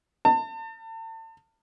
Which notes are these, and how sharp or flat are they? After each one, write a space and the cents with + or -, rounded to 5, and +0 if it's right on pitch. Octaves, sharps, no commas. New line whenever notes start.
A5 +35